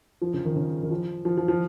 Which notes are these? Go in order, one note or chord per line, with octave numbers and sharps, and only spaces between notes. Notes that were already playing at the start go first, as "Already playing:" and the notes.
F3
C#3
D#3
C#3
D#3
F3
F3
F3
F3